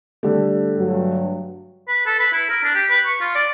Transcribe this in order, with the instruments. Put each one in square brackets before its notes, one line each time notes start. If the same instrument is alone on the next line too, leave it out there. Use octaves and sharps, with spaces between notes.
[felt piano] D3 G3 A3
[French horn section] G2 F#3
[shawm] B4
A4
B4
E4
A#4
D4
G4
B4
C#6
F4
D5